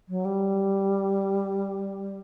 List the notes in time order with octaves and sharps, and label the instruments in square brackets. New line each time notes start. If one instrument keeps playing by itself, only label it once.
[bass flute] F#3
G3